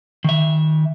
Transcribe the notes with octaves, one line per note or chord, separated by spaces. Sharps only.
D#3 E5